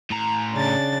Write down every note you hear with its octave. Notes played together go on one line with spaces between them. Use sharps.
A2 A#5
C#3 D4 A6